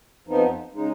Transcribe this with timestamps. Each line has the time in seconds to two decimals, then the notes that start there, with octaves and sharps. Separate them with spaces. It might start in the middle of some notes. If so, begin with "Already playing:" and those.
0.27 F2 F3 B3 D#4
0.73 C#3 G#3 D#4